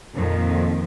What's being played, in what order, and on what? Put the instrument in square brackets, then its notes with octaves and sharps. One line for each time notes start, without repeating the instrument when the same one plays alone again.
[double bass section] F2 [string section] A#2 D#3 F3